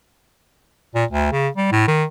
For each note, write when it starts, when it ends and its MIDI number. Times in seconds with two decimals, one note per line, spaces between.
0.95 1.05 46
1.11 1.30 38
1.32 1.49 49
1.57 1.68 55
1.72 1.87 45
1.88 2.04 51